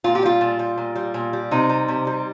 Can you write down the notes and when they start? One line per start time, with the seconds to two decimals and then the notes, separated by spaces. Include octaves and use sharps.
0.04 A#2 F4
0.15 G4
0.23 G3 F4
0.41 A#2
0.59 G3
0.78 A#2
0.96 G3
1.14 A#2
1.33 G3
1.51 C3 D#4
1.69 G3
1.88 C3
2.07 G3